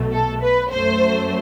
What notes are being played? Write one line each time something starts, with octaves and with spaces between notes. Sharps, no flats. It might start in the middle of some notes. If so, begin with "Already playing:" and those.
Already playing: B1 B2 A3
A4
B4
F#2 F#3 A3 C5